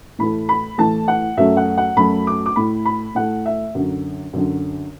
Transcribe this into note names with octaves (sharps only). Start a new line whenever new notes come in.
A2 E3 A3 B5
B5
A2 E3 A3 A5
F#5
F#2 F#3 A3 E5
F#5
F#5
F#2 F#3 A3 B5
D6
D6
A2 A3 B5
B5
A2 A3 F#5
E5
F#2 D3 F#3
F#2 D3 F#3